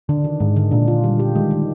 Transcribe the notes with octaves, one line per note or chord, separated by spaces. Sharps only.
D3 D4
D#3
G#2 G#3
D3
A#2 D4
F4
G3
G4
D#3 G#3
D#3